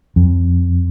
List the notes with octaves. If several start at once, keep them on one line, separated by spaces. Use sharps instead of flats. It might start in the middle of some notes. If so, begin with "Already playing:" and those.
F2